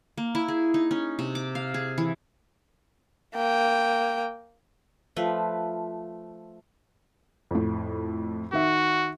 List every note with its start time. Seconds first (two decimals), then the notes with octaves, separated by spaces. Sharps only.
0.18 A#3
0.35 E4
0.48 G#4
0.74 D#4
0.91 C#4
1.19 C3
1.35 D6
1.55 F5
1.74 G#4
1.98 E3
3.35 A#3 G5
5.16 F3 A3 B4
7.51 F2 A2
8.53 D#3 F#4 E5